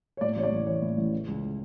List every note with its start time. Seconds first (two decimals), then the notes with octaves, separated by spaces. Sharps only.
0.17 C#5
0.21 A2 D5
0.36 A1 C#5
0.44 D5
0.52 A1
0.67 E3 C#5
0.82 A2
0.97 A1
1.12 C#3
1.28 C#2